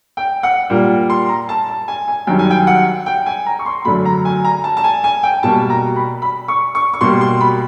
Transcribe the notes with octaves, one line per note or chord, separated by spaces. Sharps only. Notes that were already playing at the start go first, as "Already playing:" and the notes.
G5
F#5
A#2 G3 A#3
C6
A#5
A5
A5
G#5
G#5
F#2 D#3 G3 G5
G#5
G5
F#5
G5
G#5
A#5
C#6
C6
F#2 D3 F#3 A3 B5
A#5
G#5
A#5
A5
A5
G#5
G#5
G5
B2 G3 A#3 A5
A#5
B5
B5
C#6
C#6
C#6
B2 G3 A#3 C6
C6
B5